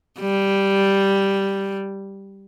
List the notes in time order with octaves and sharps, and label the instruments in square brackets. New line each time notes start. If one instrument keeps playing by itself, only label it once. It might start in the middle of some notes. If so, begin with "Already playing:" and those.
[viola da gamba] G3